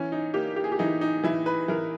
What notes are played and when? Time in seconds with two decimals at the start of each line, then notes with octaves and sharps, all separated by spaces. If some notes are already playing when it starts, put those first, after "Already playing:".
Already playing: E3 C#4
0.12 D#4
0.34 A#3 G4
0.56 G4
0.64 G#4
0.72 G4
0.79 E3 D#4
1.01 D#4
1.24 E3 E4
1.46 B4
1.68 E3 A#4